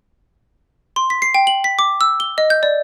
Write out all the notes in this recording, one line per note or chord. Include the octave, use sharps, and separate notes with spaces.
C6
B6
C7
G5
F#7
B6
D6
E6
G7
D#5
G6
D5